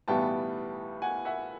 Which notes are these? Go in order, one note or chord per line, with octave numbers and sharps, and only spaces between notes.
B1 A2 E3 G3 B3 G5 A5
F#5 G#5
E5 F#5